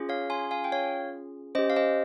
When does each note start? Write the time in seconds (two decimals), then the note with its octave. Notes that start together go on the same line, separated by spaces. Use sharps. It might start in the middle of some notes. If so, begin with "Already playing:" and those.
Already playing: C#4 F4 G#4
0.09 C#5 F5
0.30 G#5 C6
0.51 F5 G#5
0.64 G5
0.72 C#5 F5
1.55 C#4 C5 D#5
1.59 G4
1.70 F5
1.76 C5 D#5